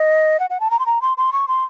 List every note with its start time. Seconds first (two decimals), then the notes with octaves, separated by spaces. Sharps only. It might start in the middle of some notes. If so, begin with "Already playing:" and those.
Already playing: D#5
0.40 F#5
0.50 F#5
0.60 A5
0.71 A#5
0.79 C6
0.86 A#5
1.02 C6
1.17 C6
1.33 C#6
1.48 C6